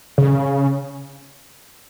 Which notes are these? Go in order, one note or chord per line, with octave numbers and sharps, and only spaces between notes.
C#3